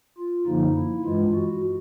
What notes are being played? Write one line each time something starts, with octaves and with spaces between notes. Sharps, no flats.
F4
F#2 D3 F3 A#3 D#4
E4
G2 E3 G#3 F4
F#4